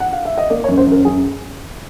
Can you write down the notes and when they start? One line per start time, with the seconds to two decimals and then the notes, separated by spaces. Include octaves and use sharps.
0.00 F#5
0.13 F5
0.25 E5
0.38 D#5
0.50 A#3 D5
0.64 C#5
0.68 F#2
0.77 C5
0.87 F#2 A#4
1.05 F#2 G#4